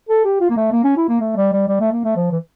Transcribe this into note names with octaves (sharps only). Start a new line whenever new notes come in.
A4
G4
F4
A#3
A3
A#3
C#4
E4
A#3
A3
G3
G3
G3
A3
A#3
A3
F3
E3